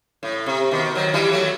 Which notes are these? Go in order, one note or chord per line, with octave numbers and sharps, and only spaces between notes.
A2
C3
B2 D#3
D#3 F#3
E3 G3
F#3 A3